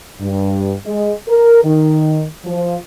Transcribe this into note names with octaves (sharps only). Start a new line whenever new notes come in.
G2
G#3
A#4
D#3
F3